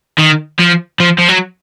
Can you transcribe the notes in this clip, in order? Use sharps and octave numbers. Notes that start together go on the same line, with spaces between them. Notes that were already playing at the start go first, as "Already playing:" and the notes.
D#3
F3
F3
F3
F#3